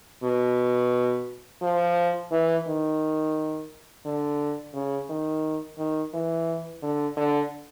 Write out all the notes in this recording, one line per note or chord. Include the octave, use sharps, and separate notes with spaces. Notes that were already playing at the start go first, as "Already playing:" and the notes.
B2
F3
E3
D#3
D3
C#3
D#3
D#3
E3
D3
D3